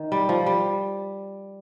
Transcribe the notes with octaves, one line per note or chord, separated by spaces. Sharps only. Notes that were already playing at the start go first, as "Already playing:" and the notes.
Already playing: D#3
G3
F3
G3